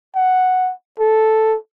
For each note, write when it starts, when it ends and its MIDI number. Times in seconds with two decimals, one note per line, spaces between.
0.16 0.72 78
1.00 1.56 69